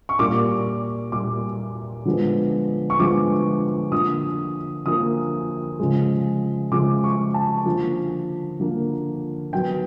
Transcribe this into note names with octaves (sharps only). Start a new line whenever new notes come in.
C#6
A#2 G3 A#3 D6
A#2 G3 A#3 D6
D3 F3 G#3 B3
C#6
D3 F3 G#3 B3 D6
D3 F3 A#3 D#6
D3 F3 A#3 D#6
C#3 F3 G#3
C#3 F3 G#3 D6
C#6
A5
D3 F3 A#3
D3 F3 A#3
D#3 F#3 B3 G5